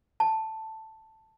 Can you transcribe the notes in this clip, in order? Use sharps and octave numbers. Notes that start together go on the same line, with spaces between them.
A5